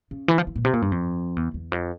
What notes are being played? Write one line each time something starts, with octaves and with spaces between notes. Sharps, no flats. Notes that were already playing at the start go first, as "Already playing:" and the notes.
C#3
E3
F3
E3
A#2
C3
A#2
G2
F2
E2
E2
F2